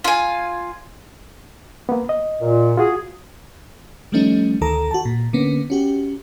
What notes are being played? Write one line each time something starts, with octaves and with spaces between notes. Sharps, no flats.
F4 G#5
A#3 B3
D#5
A#2
F4 F#4 G#4
D#3 F3 G3 A3 C#4 D#4
D2 D#3 A4 A#5
F#4 A5
A#2
D3 A#3 B3 C#4
C#4 F#4 G4